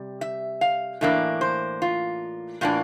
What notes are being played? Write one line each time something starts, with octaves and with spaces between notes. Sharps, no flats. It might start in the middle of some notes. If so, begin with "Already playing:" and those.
Already playing: C3 G3
E5
F5
A2 E3 A#3 D4 E5
C5
F4
A2 E3 A#3 D4 F4